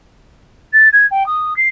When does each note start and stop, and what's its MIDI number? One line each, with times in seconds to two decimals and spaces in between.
0.73 0.88 93
0.93 1.06 92
1.11 1.26 79
1.26 1.56 87
1.56 1.68 96